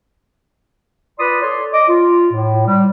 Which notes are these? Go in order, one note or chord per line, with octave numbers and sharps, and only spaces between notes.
F4 B4 D5 B5 C6 D#6
A4 C#5 D5 C6
D#5 D6
F4
A2
G3